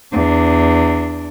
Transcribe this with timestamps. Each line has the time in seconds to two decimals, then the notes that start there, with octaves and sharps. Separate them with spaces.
0.13 E2 D4